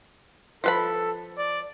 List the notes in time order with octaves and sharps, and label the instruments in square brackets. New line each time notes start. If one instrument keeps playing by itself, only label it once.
[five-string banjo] F3 B4 B5 [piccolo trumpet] A4
[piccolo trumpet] D5